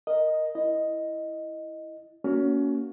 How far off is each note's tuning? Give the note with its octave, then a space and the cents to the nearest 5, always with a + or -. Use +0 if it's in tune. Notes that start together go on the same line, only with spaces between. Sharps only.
A#4 +0 D#5 +0
E4 +0 D#5 +0
A#3 +0 C#4 +25 F#4 +0